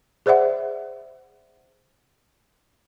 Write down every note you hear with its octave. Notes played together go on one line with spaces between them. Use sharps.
G#4 C5 D5 E5 F#5